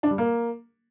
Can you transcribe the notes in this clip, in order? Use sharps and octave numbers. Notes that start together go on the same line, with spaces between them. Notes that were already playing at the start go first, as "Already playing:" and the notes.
D4
G3
A#3